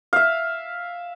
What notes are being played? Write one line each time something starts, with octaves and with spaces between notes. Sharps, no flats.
E5 F5